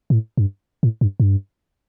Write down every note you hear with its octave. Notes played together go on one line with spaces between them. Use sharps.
A2
G2
A2
G2
G2